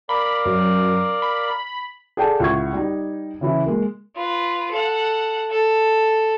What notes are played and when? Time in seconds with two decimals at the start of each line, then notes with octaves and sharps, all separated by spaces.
0.09 A#4 D5 F5 B5
0.45 F#2
1.22 B5
2.17 G#4 A4 D5 F#5 G5 A5
2.40 C#2 E4 F#5 C#6 G#6
2.73 G3 D#4
3.41 C#3 E3 E4
3.66 G#3 A#3
4.16 F4 B4
4.71 A4 F#5
5.51 A4